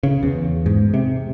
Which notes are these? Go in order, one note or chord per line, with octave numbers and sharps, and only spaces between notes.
C#3
E2
G#2
C3